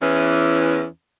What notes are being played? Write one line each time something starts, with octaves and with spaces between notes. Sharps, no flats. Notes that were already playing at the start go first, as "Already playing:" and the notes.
E2 E3 C#4